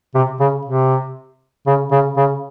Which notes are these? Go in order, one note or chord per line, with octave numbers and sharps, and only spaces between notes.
C3
C#3
C3
C#3
C#3
C#3